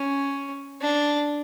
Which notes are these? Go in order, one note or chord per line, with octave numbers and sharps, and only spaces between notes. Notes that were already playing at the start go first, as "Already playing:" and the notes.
Already playing: C#4
D4